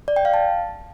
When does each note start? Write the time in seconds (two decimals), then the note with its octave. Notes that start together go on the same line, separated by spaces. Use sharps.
0.08 D5
0.16 G5
0.25 F5
0.34 A5